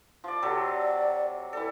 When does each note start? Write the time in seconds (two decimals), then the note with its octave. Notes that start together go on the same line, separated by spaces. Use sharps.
0.24 F3 D5
0.43 C3 F#3 A4 D5
1.53 E3 A4 D5